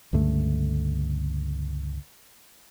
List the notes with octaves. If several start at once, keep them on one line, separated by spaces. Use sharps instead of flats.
C#2 G2 D3 A3